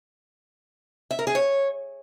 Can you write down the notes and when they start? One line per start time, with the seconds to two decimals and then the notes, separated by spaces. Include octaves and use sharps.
1.11 E5
1.19 A#4
1.27 G#4
1.35 C#5